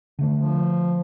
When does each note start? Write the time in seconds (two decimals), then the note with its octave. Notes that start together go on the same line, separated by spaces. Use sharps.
0.19 D3 A3 D4
0.38 F3